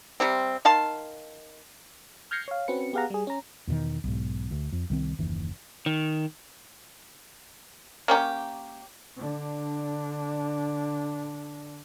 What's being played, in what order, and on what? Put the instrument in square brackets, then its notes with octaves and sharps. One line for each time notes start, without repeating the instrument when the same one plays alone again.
[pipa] C3 G3 C4
D#3 F5 A5 C6
[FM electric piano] F6 G6 G#6 A#6 C7 C#7
C#5 F5
C4 C#4 F#4 B4 C#7
B3 G4 G#4 F5 F#5 A#5
G3 G#4
C#4 A#5
[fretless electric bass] E2 B2 D3 D#3
B1 G#2
D2
F2
C2 D#3 C4
F#1 D#2 E3
[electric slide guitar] D#3
[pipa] A#3 C#4 G4
[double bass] D3 D4